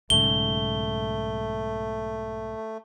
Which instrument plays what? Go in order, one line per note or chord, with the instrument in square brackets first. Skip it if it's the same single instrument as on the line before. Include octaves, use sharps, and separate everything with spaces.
[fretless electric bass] B1 G#2 C#3 [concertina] A3 [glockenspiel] G7